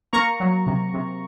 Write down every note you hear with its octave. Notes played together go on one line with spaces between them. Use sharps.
A#3 A#5 C#6
F#3
C3
C3